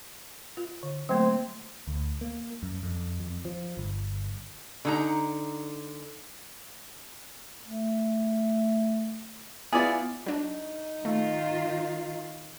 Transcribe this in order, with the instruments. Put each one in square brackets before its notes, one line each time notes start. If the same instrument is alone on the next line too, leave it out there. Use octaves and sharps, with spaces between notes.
[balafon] F4
D3
[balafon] F#3 A3 A#3 [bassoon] C4
[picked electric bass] D2
A#3
F#2
F2
F2
F3
G1
[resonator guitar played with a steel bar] D3 D#4 A#5
[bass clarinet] A3
[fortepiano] B3 E4 F4 [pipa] G#4 D5
[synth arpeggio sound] F#3 D4 [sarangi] D#4
[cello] D#3 F4 [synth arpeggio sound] A3